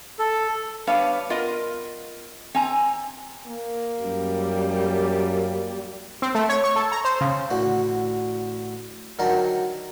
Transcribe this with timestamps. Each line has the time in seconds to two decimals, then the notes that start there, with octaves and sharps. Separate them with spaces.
0.19 A4
0.87 G3 B3 D4 B4 C#5 F5
1.30 B3 F4 A#4 D#5
2.55 C4 G#5 A#5
3.46 A#3
4.02 F#2 G3
6.22 C4
6.35 A3
6.49 C#5
6.64 C#6
6.76 A4
6.92 A#5
7.05 C5
7.21 C#3
7.50 A1 D3 F#4
9.19 D3 D#3 F#3 A#4 A5